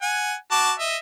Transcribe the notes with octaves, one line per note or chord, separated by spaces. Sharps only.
F#5 G#5
F#4 A5 D6
D#5 E5